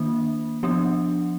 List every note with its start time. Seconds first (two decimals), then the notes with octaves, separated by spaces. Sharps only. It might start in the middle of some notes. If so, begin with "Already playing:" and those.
Already playing: D#3 A#3 D4
0.63 F3 B3 D4